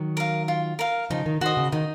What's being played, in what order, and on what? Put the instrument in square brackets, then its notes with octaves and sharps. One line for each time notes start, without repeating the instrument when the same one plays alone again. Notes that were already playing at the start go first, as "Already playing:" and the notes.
Already playing: [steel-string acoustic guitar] D#3 F#3
[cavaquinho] A#4 F5
F4
A#4 F5
[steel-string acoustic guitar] C#3 F3 [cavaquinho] D#4
[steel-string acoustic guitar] D#3
[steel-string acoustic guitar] D#3 [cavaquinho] F#4 C5 D#5
[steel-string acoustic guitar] C#3
[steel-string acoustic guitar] D#3 [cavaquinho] D#4